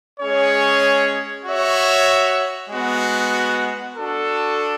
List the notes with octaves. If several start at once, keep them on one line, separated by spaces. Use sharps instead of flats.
G#3 C#4 G#4 C#5
F#4 C#5 E5
G#3 B3 F#4
D4 F#4 A4